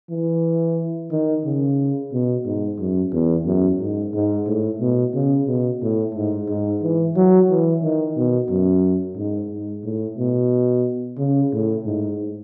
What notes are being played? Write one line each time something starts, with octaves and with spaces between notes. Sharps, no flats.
E3
D#3
C#3
B2
G#2
F#2
E2
F#2
G#2
G#2
A2
B2
C#3
B2
A2
G#2
G#2
E3
F#3
E3
D#3
B2
F#2
G#2
G#2
A2
B2
C#3
A2
G#2